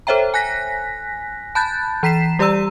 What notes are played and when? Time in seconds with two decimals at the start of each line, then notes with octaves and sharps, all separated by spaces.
0.07 A4 C5 C#5 E5 G5 A#5
0.34 G#5 F#6 A#6 B6
1.55 A5 B5 F#6 G6 A6
2.03 E3 A#5 B6 C7 E7
2.39 G3 G4 D5 A#5 E6 D#7